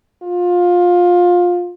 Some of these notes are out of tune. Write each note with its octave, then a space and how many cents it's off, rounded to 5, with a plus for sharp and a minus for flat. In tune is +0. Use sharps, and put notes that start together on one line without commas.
F4 +20